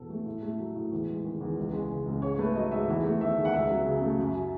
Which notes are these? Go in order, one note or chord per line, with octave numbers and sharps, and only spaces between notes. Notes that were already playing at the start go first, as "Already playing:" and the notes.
Already playing: E2 B2 F#3 A4
A3
A2
A3
F#3
A2
E2
G#3
D#3
E2
C#2
G#3
C#3
C#2
G#2 C#5
A3 B4
F#3 D#5
G#2 E5
E2
A3
D#3 E5
E2
F#5
C#2 E5
F#3
C#3
A3
F#2
F#3